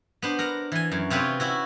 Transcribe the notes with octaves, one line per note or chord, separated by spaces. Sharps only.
B3 D4 C5
A#4 F#5 A#5
E3 G#5
F#2
C3 C4 F4 B4 C#5 D5
C#4 E4 F#4